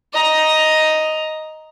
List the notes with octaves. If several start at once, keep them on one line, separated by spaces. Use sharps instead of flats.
D#5 A#5